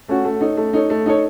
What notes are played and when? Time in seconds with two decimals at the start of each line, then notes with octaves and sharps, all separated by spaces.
0.08 A3 C#4 F#4
0.25 A3
0.41 D#4 A4 C#5
0.57 A3
0.73 D#4 A4 C#5
0.90 A3
1.06 D#4 A4 C#5